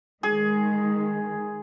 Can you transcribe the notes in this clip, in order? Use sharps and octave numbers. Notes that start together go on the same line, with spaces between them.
D#3 G#3 G#4